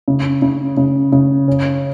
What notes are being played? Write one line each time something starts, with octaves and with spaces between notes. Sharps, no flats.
C#3
C#3
C#3
C#3
C#4